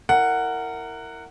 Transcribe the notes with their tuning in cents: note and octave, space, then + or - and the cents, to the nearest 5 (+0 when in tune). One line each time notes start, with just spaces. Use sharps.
E4 +0 A#4 -20 F#5 +0